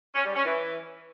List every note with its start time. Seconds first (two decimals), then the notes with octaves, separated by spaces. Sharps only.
0.14 C#4
0.24 G3
0.34 C#4
0.44 E3